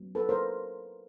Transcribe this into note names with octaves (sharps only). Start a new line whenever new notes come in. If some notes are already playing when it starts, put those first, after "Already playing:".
Already playing: F#3 B3
A4 B4
A#4 C5